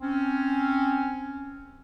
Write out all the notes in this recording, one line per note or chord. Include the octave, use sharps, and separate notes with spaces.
C4 C#4